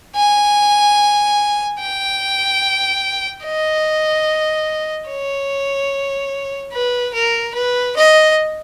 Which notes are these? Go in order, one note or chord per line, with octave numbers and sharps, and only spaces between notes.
G#5
G5
D#5
C#5
B4
A#4
B4
D#5